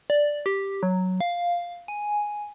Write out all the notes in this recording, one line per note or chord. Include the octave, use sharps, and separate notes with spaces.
D5
G4
F#3
F5
G#5